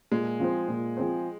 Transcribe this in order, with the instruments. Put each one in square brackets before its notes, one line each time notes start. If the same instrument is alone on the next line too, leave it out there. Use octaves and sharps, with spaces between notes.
[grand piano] A#2 [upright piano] G#3
[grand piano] F3 C4 G#4 C5
A#2
F3 C4 G#4 C5